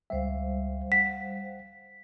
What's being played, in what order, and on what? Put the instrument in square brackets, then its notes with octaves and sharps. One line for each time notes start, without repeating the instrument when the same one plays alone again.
[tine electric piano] C#2 E5 [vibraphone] G3 C5 F5
[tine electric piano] F#5 [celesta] B6